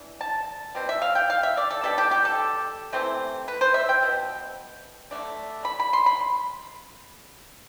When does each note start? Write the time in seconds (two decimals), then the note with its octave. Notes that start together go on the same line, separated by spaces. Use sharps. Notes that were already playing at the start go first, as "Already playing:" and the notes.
Already playing: E3 D4
0.21 A5
0.75 B2 G3 C4
0.89 E5
1.02 F5
1.15 G5
1.30 F5
1.43 E5
1.57 D5
1.70 A4
1.84 B2 G3 D4 A4
1.98 G4
2.11 G4
2.25 A4
2.92 C3 E3 A3 C4
3.48 B4
3.61 C5
3.74 E5
3.89 G5
4.02 B2 B3
5.11 D3 A3 D4
5.65 B5
5.80 B5
5.93 C6
6.06 B5